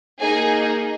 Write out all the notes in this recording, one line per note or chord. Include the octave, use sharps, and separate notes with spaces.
A#3 D#4 G#4 G#5